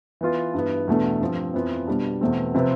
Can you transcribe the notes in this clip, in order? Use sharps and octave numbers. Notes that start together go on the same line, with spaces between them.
E3 B3 F4
G2 E3 B3
E2 B2 A3 D4
G2 F3 C4
F2 E3 B3 F4
B2 G3 D4
E2 B2 A3 C4
C3 F3 C4 G4 B4